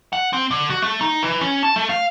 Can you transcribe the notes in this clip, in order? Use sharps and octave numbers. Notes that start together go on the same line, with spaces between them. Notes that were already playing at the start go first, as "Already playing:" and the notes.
F#5
C4
D3
F#4
A3
D#4
E3
C#4
A5
A3
F5